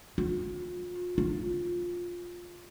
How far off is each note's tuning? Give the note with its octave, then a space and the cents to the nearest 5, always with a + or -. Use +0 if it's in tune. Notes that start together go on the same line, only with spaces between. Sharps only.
F4 +35
F4 +10